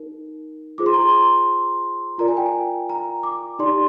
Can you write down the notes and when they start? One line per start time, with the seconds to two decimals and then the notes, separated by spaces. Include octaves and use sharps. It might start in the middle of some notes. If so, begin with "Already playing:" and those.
Already playing: D#4 A#4
0.78 F4 G#4 C5 D6
0.86 C6
0.94 A#5
1.01 C6
2.18 F4 A#4 D5 A#5
2.28 G#5
2.37 G5
2.46 G#5
2.89 A#5
3.23 D6
3.59 D#4 G4 D5 C6